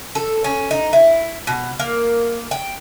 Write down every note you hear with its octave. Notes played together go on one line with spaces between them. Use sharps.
A4
C#4
D#4
E4
B2
A#3
G5